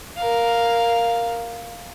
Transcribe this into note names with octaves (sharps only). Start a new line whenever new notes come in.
A#4 F5